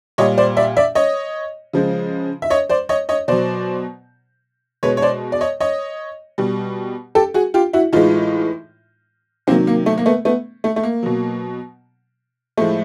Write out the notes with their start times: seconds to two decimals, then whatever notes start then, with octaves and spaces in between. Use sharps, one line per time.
0.18 A#2 G3 C#5 D#5
0.38 C5 D5
0.57 D5 E5
0.77 D5 E5
0.95 C#5 D#5
1.73 C#3 F3 G#3
2.42 E5
2.50 C#5 D#5
2.69 C5 D5
2.89 C#5 D#5
3.09 C#5 D#5
3.28 B2 F#3 C5 D5
4.83 B2 G#3 B4 C#5
4.97 C#5
5.02 C5 D5
5.32 D5
5.41 C#5 D#5
5.60 C#5 D#5
6.38 B2 G3
7.15 G4 A4
7.34 F#4 G#4
7.54 F4 G4
7.73 E4 F#4
7.93 A2 E3 G#3 D#4 F4
9.47 C3 D#3 F#3 A#3 C4
9.67 A#3
9.86 A3
9.98 A#3
10.06 A3 B3
10.25 A3 B3
10.64 A3
10.76 A3
10.83 A#3
11.03 B2 F#3
12.57 A2 F3 G#3 A3